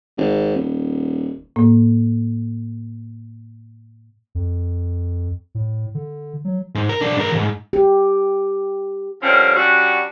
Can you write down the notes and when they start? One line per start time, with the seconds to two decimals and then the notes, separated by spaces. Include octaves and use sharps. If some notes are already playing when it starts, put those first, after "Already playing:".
0.17 G#1
0.56 D#1
1.56 A2 A#3
4.35 F2
5.55 A2
5.94 D3
6.45 F#3
6.75 G#2
6.89 A#4
7.01 B1 D4
7.16 G#2 A#4
7.32 D#2 G#2
7.73 G4
9.21 D3 F3 G3 C4 C#4 A#4
9.56 G3 C#4 D4 F#4